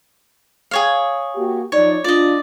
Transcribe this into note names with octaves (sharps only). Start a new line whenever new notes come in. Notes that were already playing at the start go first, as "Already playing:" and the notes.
G#4 C#5 F5
A#3 F#4 G4
F3 D#4 C#5 D5
D4 F4 D5 D#5